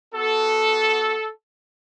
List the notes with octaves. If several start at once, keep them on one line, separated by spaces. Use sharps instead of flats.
B3 F#4 A4